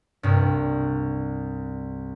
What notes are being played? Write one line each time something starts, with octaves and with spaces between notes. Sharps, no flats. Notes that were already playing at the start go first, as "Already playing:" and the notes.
C2 G2